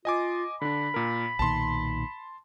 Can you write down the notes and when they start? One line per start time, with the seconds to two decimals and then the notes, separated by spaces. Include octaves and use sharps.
0.05 F4 D#5 G#5 D6
0.62 D3 D4 B5
0.94 A#2 A#4
1.39 B1 A#2 D#3 A5 C6